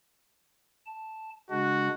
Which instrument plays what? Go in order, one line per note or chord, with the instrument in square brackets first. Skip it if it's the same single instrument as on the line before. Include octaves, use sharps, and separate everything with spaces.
[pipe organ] A5
[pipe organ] C#3 G#3 D4 [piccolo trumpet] F#4